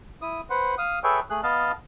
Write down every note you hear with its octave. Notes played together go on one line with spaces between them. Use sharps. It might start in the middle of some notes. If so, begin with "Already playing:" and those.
E4 D#6
B4 C5 F#5
F5 D#6
G#4 A4 B4 C#5 E5 G5
A3 G#4 F#6
B3 D#5 F5 A5